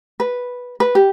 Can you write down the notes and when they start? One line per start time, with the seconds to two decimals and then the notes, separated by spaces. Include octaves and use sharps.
0.20 B4
0.80 B4
0.95 G4